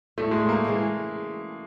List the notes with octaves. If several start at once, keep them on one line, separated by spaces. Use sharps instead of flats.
A2 A3
G#3
A3
A#3
E3 G#3 C#4